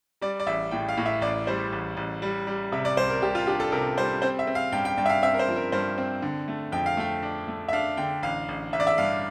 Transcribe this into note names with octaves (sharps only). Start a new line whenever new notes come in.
G3 D5
D5
A1 E5
A2 G5
F5
A2
E5
A1 D5
G3 C5
A1
A1
G3
G3
C3 E5
D5
C2 C5
A#4
C2 G4
F4
D4 G4
A4
C3 A#4
G3 C5
C4 C5
E5
C4
F5
G2 G5
G5
G2 G5
E5
F5
C4 E5
A#4
C5
F3
A#4
G2 C5
C4
D3
A3
F2 G5
F5
A3 G5
D4
A3
E5
D4 F5
D3 G5
A1 F5
A1
A1 E5
D5
E5
G2 F5